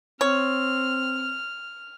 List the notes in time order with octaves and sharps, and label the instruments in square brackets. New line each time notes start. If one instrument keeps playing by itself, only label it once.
[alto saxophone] C4 [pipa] C#5 [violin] F6